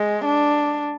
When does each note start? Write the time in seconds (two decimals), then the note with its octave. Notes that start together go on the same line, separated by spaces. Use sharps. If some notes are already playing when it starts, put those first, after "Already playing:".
Already playing: G#3
0.25 D4